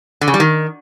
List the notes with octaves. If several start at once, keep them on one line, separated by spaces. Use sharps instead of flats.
D3
C#3
G3
D#3